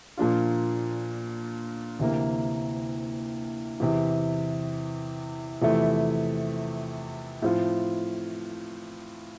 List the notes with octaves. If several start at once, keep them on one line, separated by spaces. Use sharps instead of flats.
A#2 F3 A#3 D4 F4
D2 C3 E3 A#3
E2 C3 E3
E2 C3 F3 A3 E4
A2 F3 C4 F4